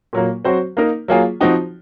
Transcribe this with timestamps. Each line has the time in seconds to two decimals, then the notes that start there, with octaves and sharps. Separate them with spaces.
0.13 A#2 F#3 A#3
0.45 F#3 C4 F#4 C5
0.77 A#3 D#4 A#4
1.08 F#3 A#3 F4 G#4
1.41 F3 C4 D#4 F#4